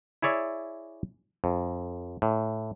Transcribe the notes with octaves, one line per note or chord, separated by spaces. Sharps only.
E4 G#4 C#5 D5 E5
F2
A2